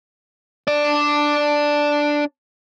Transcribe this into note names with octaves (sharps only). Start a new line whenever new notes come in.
D4 D5